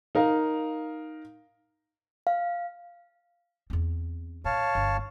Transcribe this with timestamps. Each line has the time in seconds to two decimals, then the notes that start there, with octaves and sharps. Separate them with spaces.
0.15 D#4 A#4 F5
2.27 F5
3.70 E2 C4
4.45 A#2 C#5 F5 A5
4.75 G1